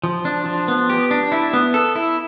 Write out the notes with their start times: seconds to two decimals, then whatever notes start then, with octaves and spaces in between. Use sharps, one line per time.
0.03 F3
0.25 D4
0.46 F3
0.68 B3
0.90 G4
1.11 D4
1.32 E4
1.53 B3
1.74 A4
1.96 E4